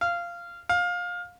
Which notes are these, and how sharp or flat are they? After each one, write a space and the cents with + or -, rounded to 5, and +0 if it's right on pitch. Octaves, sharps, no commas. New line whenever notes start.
F5 -15
F5 +20